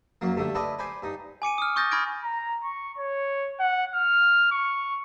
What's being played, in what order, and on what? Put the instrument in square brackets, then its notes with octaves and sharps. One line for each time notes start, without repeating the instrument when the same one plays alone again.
[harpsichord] F#2 F#3 A#3
G2 D3 A3
E4 A4 B4 D5 D#5
B4 C5 D5 G#5
G2 D#4
[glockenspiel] G#5 D6 C#7 D#7
D#6 F6
C#6 D#6 G6 A6 A#6
B5 C#6 F6 G#6 A#6 D7
[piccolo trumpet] A#5
C#6
C#5
F#5
F6
C#6